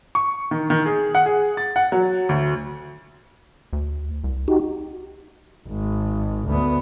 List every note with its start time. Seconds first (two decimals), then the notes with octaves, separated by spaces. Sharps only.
0.15 C#6
0.51 D#3
0.70 D#3
0.86 G#4
1.15 F#5
1.26 G#4
1.57 A6
1.76 F#5
1.92 F#3
2.29 D2
3.73 D2
4.24 C2
4.48 D#4 F#4 G4
5.68 G#1
6.48 D2 B3